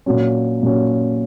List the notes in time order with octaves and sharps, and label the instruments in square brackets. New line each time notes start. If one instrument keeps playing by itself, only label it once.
[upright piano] A#2 F#3 C#4
A#2 F#3 C#4